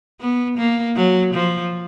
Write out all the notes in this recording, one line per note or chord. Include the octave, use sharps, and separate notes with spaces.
B3
A#3
F#3
F3